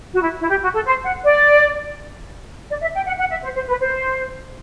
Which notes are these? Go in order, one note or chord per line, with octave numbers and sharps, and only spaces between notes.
F#4
E4
E4
G4
F#4
A4
C5
F#5
D5
D5
E5
G5
F#5
F#5
E5
C5
C5
B4
C5